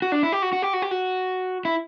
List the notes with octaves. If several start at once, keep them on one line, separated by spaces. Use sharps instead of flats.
F#4
D4
E4
G4
F#4
F#4
G4
F#4
G4
F#4
E4